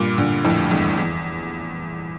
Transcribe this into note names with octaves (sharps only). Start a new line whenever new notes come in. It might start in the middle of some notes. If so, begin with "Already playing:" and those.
Already playing: G2 A#2
A#2 D3
F2 A2
E2 G2
E2